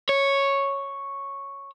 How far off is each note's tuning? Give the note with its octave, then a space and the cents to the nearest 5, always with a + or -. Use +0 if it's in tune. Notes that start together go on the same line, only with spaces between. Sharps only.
C#5 -5